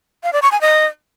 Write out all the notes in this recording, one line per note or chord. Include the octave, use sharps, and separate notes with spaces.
F5
D5
C#6
G#5
D#5